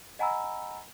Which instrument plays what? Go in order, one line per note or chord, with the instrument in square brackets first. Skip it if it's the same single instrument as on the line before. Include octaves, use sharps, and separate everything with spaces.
[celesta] D#5 F#5 G#5 A#5 B5 E6